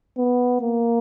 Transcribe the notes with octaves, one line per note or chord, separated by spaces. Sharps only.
B3
A#3